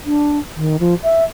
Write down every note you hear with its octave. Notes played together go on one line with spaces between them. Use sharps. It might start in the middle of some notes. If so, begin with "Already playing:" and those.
D4
D#3
F3
E5